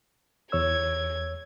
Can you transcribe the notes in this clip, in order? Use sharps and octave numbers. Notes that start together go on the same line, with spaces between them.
E2 C#5 E6 G#6